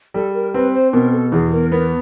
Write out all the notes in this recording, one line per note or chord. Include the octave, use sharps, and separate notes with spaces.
G3 A4
A#4
C4 B4
C5
B2 A#4
A4
E2 G#4
A#4
B3 A#4